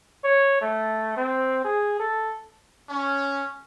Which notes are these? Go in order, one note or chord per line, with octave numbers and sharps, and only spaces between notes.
C#5
A3
C4
G#4
A4
C#4